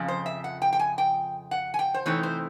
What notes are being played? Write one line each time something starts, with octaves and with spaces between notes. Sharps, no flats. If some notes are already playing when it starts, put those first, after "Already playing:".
Already playing: F2 C#3 F3
C5
E5
F#5
G5
G5
G#5
G5
F#5
G#5
G5
C5
C3 E3 A3 C4 D#4 C#5
C5